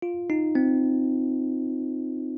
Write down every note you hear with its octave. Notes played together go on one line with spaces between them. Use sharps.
F4
D#4
C4